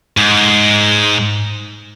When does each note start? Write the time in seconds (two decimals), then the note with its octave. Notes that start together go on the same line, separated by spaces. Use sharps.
0.17 G#2